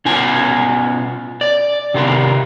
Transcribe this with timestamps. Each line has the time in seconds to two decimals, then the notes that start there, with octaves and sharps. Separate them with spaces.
0.05 B2 C#4 F4 G#5
1.41 D5
1.94 C3 D#3 F4 A#4